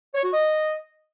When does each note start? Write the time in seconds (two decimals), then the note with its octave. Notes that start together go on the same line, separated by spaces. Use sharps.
0.15 C#5
0.24 F#4
0.34 D#5